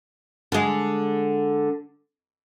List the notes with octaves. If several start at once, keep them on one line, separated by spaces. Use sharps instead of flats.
D3 G#3